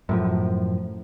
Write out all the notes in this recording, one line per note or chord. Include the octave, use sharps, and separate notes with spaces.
F#2 A2 F3